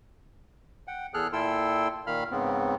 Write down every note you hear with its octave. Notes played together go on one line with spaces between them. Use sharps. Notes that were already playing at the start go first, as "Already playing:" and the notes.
F#5 G5
E2 G#4 A4 F6 F#6
A#2 E4 A4 G5 C6 E6
A#2 D#3 F5 B5 F6
G#2 C#3 B3 C4